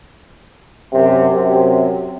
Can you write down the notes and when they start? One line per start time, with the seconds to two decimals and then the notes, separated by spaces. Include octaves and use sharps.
0.93 F#2 C3
1.32 F#2 C3 C4